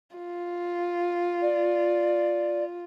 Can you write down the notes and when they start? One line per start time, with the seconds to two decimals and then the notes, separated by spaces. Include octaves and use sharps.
0.16 F4
1.42 D5